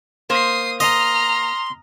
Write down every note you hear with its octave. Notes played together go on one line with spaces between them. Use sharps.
A#3 C5 D#6 C7
D#5 A#5 C6 F6